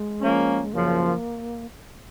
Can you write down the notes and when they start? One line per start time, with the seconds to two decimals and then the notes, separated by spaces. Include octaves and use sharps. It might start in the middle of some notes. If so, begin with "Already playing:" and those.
Already playing: G#3
0.21 F3 A#3 C#4
0.62 G#3
0.72 F#2 C#3 F3 A#3